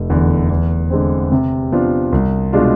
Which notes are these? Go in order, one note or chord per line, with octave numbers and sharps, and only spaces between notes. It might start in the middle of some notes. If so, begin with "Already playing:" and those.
Already playing: F1
E2 D3
E2
D3 G#3 C4
C3
F3 B3 D4 F4
C2
B2 G#3 D4 F4